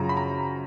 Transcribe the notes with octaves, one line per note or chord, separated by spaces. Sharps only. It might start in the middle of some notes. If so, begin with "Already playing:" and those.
Already playing: F#2 C#3 F3 A#5
B5
A#5